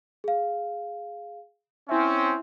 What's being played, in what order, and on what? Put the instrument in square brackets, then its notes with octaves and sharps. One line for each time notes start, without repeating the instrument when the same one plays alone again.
[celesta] G#4 F5
[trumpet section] C4 C#4 [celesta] E4 E5